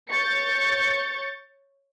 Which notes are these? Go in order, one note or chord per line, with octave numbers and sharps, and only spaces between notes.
C#5 C#6 G6 A6 C#7